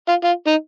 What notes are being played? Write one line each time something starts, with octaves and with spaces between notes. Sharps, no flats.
F4
F4
D#4